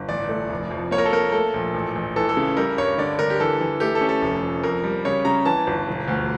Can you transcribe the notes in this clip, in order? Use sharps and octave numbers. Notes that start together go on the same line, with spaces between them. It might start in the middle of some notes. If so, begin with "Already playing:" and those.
Already playing: G1
A1 D5
A3
F1
F2
A#3 C#5
A#4
A4
A#3 A#4
A3 A4
A#1
A1
A1
E3 A4
A4
C#3
G3 A#4
G2 C#5
D3 D5
D3 A#4
G4
E3 A4
E3
A3 G4
A4
C#4
A4
F1
F2
F2 A#4
G3
C#3 C#5
C#3 A#5
E3 A5
G1
E1
D2